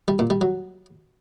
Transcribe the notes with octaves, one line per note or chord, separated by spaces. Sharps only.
G3
A#2
G3
F#3